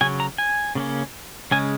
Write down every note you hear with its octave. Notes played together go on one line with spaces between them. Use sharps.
C#3 F#3 C#4 G#5
A#5
G#5
C#3 A#3 C#4
C#3 G#3 C#4 G#5